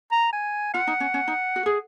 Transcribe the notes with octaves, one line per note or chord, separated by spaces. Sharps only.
A#5
G#5
F4 F#5
D#4
C#4
C#4
D#4
F#4
G#4